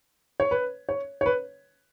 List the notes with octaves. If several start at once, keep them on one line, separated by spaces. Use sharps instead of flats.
C#5
B4
C#5
C#5
B4